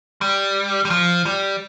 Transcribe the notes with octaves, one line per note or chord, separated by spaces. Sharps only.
G3
G3
F3
G3